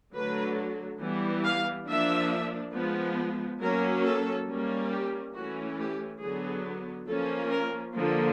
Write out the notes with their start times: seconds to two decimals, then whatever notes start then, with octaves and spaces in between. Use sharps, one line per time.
0.14 D3 F#3 A3 B4
1.01 E3 G3 B3
1.45 F5
1.88 F3 A#3 D4 E5
2.74 F3 G#3 B3
3.60 F#3 A#3 C#4 A#4
4.04 A4
4.47 G3 A#3 C#4
4.91 G4
5.34 E3 A3 C#4 F#4
5.78 G4
6.21 D3 F#3 B3 G#4
7.07 F3 A#3 C#4 A4
7.51 A#4
7.94 D3 F3 A#3